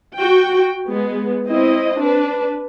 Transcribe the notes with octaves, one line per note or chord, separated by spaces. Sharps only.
F#4 G5
G#3 B3
C4 E4 D#5
D4 B4